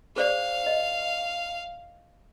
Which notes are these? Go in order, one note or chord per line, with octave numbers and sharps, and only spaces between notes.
G#4 C5 D5 F5
D#5